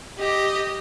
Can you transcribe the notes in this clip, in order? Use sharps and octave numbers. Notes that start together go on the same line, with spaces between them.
G4 D#5